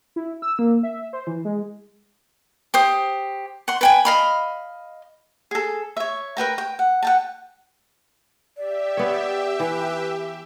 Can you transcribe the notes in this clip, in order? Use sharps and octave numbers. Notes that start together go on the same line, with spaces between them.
E4
E6
A#3
E5
C5
E3
G#3
G4 C5 D#6
F#5 C6
B4 G5 G#5
D#5 F5 B5
G#4 A4
C#5 E5
A#4 B4 G5 A#5
G5
F#5
F#5 G5 A5
G4 D5 E5
B3 C#5
E3 B4